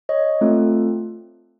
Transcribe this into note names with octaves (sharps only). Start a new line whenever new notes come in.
C#5 D#5
A3 C4 F4 A4